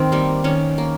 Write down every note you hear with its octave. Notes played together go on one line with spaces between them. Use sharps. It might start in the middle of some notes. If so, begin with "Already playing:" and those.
Already playing: D#3 C4
G3 A#3
D#3 C#4
A#3